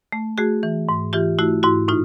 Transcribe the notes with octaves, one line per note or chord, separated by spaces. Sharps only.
A3
A3 F#4 G#4
E3
G#2
E3 F4 G4
A3 E4 F#4
G#2 E4 F#4
A2 D#4 F4